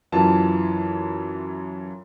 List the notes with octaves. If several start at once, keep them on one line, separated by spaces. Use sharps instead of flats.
F#2 E3 F4 A5